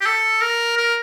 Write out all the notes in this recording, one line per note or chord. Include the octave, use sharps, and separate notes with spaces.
G4
A4
A#4
A#4